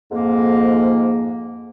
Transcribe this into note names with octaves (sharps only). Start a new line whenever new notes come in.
F2 G#2 A#3